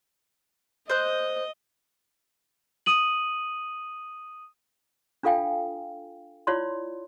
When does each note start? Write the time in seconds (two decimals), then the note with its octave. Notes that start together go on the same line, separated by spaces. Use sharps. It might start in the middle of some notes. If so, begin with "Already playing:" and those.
0.90 C5 D#5 F#6
2.86 D#6 D#7 F#7
5.23 D4 F4 A4 F5 G5 G#5
6.47 E4 F4 C#5 D5 C6